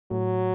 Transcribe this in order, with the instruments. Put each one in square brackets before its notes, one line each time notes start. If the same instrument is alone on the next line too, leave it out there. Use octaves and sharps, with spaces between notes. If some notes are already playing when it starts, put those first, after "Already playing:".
[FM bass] A2 [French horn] F#3